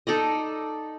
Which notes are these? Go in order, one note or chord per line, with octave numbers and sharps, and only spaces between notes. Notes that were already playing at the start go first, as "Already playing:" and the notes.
D#4 A4 D5 D#5